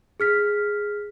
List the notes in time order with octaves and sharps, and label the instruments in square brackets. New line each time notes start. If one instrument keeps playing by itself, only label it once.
[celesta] G#4 F6 B6